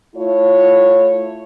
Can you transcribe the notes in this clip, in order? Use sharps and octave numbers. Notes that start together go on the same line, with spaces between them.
A3 E4 F4 C#5